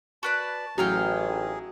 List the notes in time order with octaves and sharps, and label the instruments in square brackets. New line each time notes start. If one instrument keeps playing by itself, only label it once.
[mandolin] F#4 B4 D5 [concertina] A5
[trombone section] A1 [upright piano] F#3 [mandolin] D#4 F5 G5 [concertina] G#4